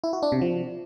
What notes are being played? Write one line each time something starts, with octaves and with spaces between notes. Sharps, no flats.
E4
F#4
D4
C3
F3